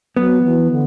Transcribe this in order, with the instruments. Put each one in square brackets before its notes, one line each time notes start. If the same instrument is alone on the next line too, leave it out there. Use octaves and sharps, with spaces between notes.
[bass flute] F#3 [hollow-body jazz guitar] B3
[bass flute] E3
D3